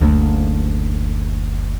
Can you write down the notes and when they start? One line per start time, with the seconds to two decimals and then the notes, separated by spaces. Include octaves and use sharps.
0.01 F#1 D2